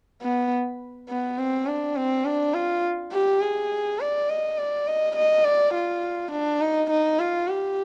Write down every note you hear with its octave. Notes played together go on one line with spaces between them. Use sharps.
B3
B3
C4
D4
C4
D4
F4
G4
G#4
D5
D#5
D5
D#5
D#5
D5
F4
D4
D#4
D#4
F4
G4